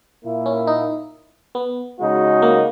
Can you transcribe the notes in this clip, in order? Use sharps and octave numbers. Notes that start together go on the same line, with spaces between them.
A#2 A#3 E4
C#4
D#4
B3
C#3 G#3 D#4 F#4
A#3